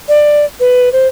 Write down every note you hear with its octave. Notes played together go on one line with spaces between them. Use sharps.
D5
B4
C5